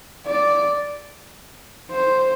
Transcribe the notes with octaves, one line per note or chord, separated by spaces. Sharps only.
D5
C5